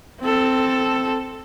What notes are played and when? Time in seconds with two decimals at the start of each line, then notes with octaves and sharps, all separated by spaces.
0.21 C4 A4